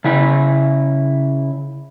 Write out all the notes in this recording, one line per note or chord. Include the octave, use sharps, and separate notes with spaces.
C#3 E4